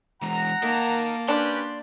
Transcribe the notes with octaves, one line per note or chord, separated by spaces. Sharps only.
E3 G#3 F#5 A#5
A#3 A#4 D#5 A5
C#4 D4 G4 B4 C6